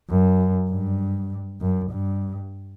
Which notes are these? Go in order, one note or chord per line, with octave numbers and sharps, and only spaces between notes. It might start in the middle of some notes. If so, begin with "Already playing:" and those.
F#2
G2
F#2
G2